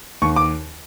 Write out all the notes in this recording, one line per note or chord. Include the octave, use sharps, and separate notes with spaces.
D#2 C#6
D6